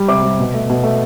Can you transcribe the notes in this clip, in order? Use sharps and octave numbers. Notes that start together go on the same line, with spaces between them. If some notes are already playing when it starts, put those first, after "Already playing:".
Already playing: G3
C3 D6
G3
B2
A3
B2
A3